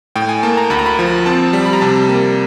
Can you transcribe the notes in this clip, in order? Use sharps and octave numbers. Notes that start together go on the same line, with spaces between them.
A2 G5
G#5
A#3 A5
A#5
D2 B5
A#5
B5
F3
C4 A5
G3
B5
A#5
C3 A5
A#3